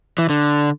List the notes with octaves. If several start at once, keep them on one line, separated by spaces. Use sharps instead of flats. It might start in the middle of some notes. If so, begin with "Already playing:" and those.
E3
D3